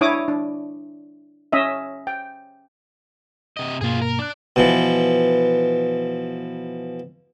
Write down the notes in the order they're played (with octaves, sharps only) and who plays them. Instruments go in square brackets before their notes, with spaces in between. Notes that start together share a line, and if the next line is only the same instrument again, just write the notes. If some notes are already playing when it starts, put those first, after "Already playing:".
[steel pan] D4 E4 C#5 D6 D#6
D4
C#4 D#5 E5
G5
[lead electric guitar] C3 D#5
[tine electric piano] G2 B2 A#3 [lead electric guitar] F4 G#4
[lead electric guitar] A#4
[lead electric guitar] D4 D5 [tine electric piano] D6 F#6
[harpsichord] B2 E3 F3